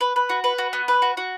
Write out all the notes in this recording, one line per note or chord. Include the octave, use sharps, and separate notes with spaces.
B4
B4
F#4
B4
F#4
B3
B4
F#4
F#4